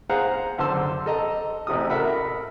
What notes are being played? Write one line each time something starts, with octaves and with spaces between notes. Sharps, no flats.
G#4 C5 F5 F#5 A#5
F#2 D3 C5 A5 C6 E6
A4 D#5 A#5
A1 C3 F#4 D#6
A4 A#4 E5 F#5 B5